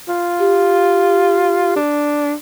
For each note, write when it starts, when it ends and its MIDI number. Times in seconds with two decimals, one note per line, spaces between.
0.09 1.72 65
0.40 1.78 67
1.76 2.34 62